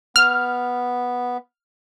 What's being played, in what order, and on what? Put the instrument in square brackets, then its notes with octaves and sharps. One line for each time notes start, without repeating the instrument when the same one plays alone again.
[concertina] B3 [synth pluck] F6